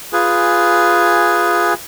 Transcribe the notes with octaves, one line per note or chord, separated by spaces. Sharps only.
F4 G#4 B4 G#5